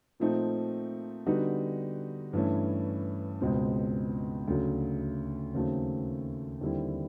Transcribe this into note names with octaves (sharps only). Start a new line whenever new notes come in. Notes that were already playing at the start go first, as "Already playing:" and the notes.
A#2 F3 A3 C4 D#4
D3 G3 B3 D#4 F#4
G2 E3 A3 C#4 E4
C#2 B2 G#3 C4
D2 C#3 F#3
D#2 C#3 F#3 A3 C4
D#2 D3 G3 C4 E4